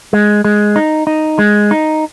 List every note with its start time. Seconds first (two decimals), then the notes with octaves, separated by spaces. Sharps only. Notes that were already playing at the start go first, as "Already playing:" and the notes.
0.13 G#3
0.45 G#3
0.76 D#4
1.07 D#4
1.39 G#3
1.71 D#4